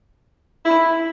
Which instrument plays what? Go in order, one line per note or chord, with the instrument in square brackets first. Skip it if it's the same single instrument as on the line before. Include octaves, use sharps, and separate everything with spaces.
[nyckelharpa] E4